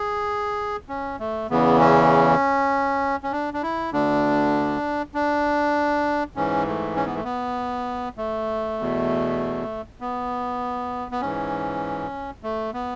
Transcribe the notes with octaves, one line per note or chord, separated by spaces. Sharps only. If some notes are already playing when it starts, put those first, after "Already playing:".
Already playing: G#4
C#4
A3
E2 C#3 E3 B3
C#4
C#4
D4
D4
E4
D2 D3 D4
D4
G#2 E3 C#4
A3
C#4
B3
A3
B3
A3
E2 B2
B3
B3
G#2 E3 C#4
A3
B3